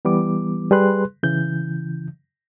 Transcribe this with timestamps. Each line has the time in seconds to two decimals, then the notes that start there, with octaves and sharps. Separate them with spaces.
0.05 E3 G3 B3 D6
0.71 G3 G#4 B4 C6 F#6
1.23 C#3 E3 G6